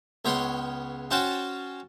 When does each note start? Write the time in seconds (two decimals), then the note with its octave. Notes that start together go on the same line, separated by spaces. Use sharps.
0.25 C#2 B3 C#5 G5 C6
1.11 C#4 F#4 C5 F#5 G5 A5